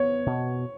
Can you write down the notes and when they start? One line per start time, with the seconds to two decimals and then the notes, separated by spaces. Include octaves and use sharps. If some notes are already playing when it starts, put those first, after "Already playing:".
Already playing: B3 C#5
0.26 B2